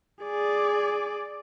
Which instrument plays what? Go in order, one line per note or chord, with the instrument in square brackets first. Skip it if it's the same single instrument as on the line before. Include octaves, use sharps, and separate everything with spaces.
[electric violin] G#4 D5